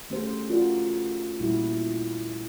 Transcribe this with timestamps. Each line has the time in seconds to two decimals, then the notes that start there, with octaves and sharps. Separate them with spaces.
0.10 A3 C#4 G4 G#4 C5
0.49 C#4 F4 F#4 A#4 D5
1.40 A#2 G3 E4 F#4